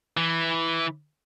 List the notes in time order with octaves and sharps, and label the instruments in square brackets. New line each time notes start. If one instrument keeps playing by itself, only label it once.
[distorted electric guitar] E3